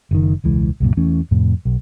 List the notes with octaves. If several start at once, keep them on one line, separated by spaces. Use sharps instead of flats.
F#1 D#3
E1 C#2 E3 G#3
C2 F#2 A#2
E2 E3 A3 C#4
F2 A2 C3
B1